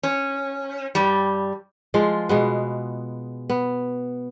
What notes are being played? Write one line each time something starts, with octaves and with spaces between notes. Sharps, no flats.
C#4
G2 G3
F3 G#3 F4
B2 G#3 B3
B3